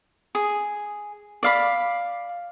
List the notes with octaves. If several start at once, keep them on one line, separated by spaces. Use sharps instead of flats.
G#4
D5 F5 B5